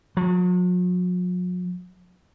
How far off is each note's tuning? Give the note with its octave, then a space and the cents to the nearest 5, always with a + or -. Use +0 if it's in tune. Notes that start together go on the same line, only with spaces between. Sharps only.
F#3 -45